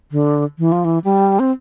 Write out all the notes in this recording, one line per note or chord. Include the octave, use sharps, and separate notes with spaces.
D3
E3
F3
E3
G3
C4